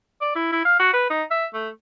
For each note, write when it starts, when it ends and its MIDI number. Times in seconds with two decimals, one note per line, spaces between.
0.22 0.34 74
0.36 0.51 64
0.53 0.62 64
0.65 0.75 77
0.80 0.93 66
0.94 1.08 71
1.10 1.24 63
1.31 1.46 76
1.54 1.69 57